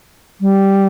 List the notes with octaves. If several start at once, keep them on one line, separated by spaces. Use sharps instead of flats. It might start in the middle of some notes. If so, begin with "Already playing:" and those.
G3